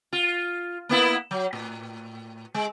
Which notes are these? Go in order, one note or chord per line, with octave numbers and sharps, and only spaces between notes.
F4
A#3 B3 E4
F#3
A2
G#3